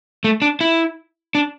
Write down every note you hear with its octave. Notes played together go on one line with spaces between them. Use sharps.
A3
D4
E4
D4